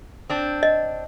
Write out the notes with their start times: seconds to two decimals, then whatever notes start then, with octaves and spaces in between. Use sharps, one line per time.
0.30 C4 D4
0.63 D#5